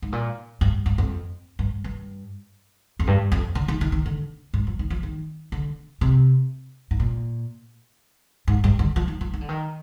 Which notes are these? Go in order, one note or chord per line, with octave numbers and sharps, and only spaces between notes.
G#2
A#2
G2
G2
F2
G2
G2
F2
G2
F2
D3
D#3
D#3
D#3
D3
G#2
F3
D#3
F3
D#3
D3
C3
G#2
A#2
G#2
G2
D3
F3
D#3
F3
D#3
D3
D#3